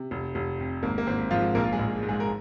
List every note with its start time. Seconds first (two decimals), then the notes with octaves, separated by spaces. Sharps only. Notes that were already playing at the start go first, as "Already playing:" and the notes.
Already playing: C3
0.11 F1
0.35 F1
0.59 F2
0.83 G#1 A#3
0.98 A#3
1.07 G#1 C4
1.31 G#2 F3 F4
1.55 A#1 A#3 A#4
1.64 F4
1.73 G#3 G#4
1.79 A#1
2.03 G#2
2.09 G#3 G#4
2.20 A#4